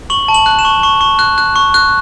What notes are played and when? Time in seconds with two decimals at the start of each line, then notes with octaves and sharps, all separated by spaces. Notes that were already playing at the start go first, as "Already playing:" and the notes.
0.10 C#6 F#7
0.28 A5
0.34 F#7
0.46 F#6
0.59 E7
0.65 C#6
0.83 C#6
1.01 C#6
1.19 F#6
1.38 F#6
1.56 C#6
1.74 F#6